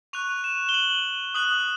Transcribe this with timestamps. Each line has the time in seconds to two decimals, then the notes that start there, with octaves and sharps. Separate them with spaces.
0.13 C#6 F#6 F7
0.44 E7
0.69 G7
0.74 F#7
1.35 D#6 F#6 F#7